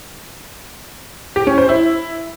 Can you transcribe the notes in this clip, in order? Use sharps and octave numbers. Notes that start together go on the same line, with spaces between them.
G4
C#4
C5
E4